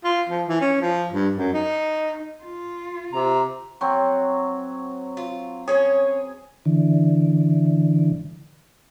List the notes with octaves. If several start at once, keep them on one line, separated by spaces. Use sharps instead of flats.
F4
F3
E3
C#4
F3
G2
F#2
D#4
F4
C3 A#5
F#3 C4
F4
C#4 G#4 C#5
D3 E3